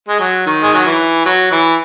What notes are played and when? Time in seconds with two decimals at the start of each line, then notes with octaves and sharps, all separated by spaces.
0.08 G#3
0.20 F#3
0.46 D#3
0.63 G#3
0.74 F#3
0.86 E3
1.26 F#3
1.51 E3